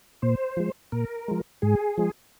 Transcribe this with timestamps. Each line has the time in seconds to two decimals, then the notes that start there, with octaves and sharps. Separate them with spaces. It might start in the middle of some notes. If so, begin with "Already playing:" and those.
0.22 A#2 C5
0.57 F3 G#3
0.92 A#2 A#4
1.28 F3 G#3
1.62 G#2 G#4
1.98 F3 G#3